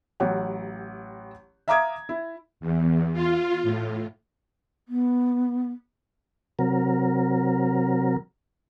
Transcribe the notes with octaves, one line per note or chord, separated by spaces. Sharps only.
A1 F#3 G4 F#5
E5 F5 A#5 D6 D#6 G#6
E4
E2
F4
A2
B3
C3 F#3 A#4